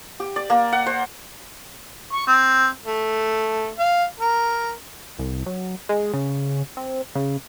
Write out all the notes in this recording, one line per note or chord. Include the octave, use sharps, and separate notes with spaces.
G4
D5
A#3
F#5
C5
C#6
C4
A3
F5
A#4
C2
F#3
G#3
C#3
C4
C#3